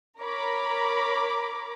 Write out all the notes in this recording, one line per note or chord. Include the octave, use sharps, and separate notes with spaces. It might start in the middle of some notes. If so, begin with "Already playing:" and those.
A#4 C#5 A#5 B5 D6